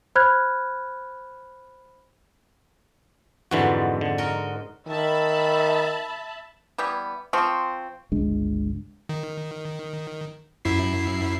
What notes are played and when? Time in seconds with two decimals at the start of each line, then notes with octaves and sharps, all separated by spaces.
0.15 C5 B5 F6 F#6 G#6
3.51 F2 G#2 D3 E3 F#4
4.01 D3
4.18 F#4 A#4 D#5
4.87 D#3 E5 A5 B5
6.78 E3 G3 B3
7.33 F3 C4 G5 C6 C#6
8.12 G1 C#2 G#3 D4
9.09 D#3
10.65 F#2 E4 C7